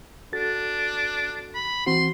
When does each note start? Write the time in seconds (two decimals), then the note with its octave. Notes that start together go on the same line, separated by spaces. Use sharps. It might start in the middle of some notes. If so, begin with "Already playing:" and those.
0.33 D4 F#4 A4 A6
1.55 B5
1.87 E3 C4 F#4 C6